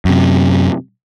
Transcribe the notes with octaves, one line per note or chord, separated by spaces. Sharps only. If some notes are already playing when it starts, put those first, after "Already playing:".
F#2 C3